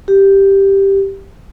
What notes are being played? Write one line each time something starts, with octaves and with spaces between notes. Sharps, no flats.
G4